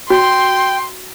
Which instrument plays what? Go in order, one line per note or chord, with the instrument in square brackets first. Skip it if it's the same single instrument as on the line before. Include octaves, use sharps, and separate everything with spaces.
[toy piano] F#4 [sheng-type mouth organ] G5 [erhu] C6